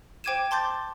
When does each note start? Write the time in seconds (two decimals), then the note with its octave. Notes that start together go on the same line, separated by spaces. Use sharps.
0.24 C5 G5 D6 G#6 D#7 E7
0.51 A5 C6 D6 G6 A6